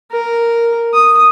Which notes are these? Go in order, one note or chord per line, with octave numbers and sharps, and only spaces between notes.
A#4
D#6